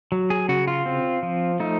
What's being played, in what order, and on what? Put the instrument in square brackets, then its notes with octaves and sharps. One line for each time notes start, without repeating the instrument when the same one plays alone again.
[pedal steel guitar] F#3
G#4
C#3 F#4
F4
C4
F3
A3 D#4